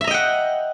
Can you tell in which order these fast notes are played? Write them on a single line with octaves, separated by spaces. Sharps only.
E5 A#5 D#5 G5 F#5